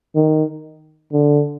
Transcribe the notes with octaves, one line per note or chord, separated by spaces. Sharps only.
D#3
D3